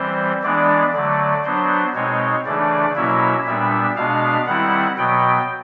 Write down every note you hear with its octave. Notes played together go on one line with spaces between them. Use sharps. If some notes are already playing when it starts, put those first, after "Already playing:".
Already playing: E3 G3 C4 C5
E3 G#3 B3 D4 D5
D3 F#3 A3 D5
F#3 B3 D4 C5
B2 G#3 C4 D#4 C#5
C#3 E3 A3 D4 D5
B2 F#3 A#3 C#4 E4 E5
A#2 G3 B3 D4 E5
B2 G#3 B3 D4 F5
D#3 G3 C4 E4 F#5
B2 F#3 B3 G5